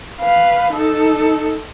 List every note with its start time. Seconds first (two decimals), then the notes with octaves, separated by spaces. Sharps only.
0.21 B4 F5
0.73 D#4 A4